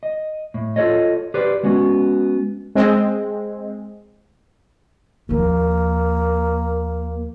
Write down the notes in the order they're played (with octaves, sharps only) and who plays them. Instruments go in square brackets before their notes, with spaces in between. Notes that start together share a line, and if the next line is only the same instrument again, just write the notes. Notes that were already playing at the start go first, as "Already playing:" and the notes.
[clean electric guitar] D#5
A2
F4 A4 B4 C#5 D#5
G4 B4 C5 D5
G#3 B3 C#4 F#4
[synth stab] G#3 C4
[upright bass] D#2 F3 [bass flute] A#3